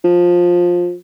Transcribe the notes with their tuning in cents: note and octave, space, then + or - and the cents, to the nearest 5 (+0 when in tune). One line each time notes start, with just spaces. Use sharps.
F3 +15